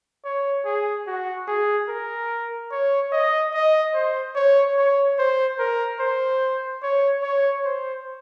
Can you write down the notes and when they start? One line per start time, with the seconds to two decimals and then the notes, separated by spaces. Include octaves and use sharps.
0.25 C#5
0.65 G#4
1.07 F#4
1.48 G#4
1.89 A#4
2.71 C#5
3.12 D#5
3.54 D#5
3.94 C5
4.36 C#5
4.77 C#5
5.19 C5
5.59 A#4
6.00 C5
6.83 C#5
7.23 C#5
7.65 C5